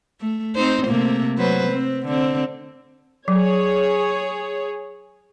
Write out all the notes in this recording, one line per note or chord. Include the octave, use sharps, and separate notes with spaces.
A3
C4 D#4 C5
C3 A3 A#3
F#3 B4 C5
C4
D3 C4
F#3 G#4 C#5